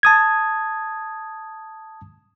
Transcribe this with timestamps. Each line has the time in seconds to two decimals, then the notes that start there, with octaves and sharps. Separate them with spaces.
0.03 A5 D#6 G#6